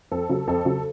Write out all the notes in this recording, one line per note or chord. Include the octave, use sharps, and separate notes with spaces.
F2 A4
C#3 F#3
F2 A4
C#3 F#3